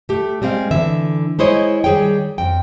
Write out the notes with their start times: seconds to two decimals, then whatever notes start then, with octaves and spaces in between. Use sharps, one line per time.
0.09 A3 G4
0.42 G3 G#3 C4 F5
0.71 D3 E3 E5
1.39 G#3 E4 C5 C#5 D#5
1.84 D#3 G3 G#4 C#5 G5
2.38 F2 G5